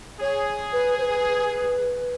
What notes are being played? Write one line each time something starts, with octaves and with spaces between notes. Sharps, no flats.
G#4 C#5
B4
C5
B4